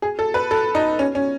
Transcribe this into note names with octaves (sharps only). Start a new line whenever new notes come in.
G#4
A4
B4
A4
D#4
C#4
C#4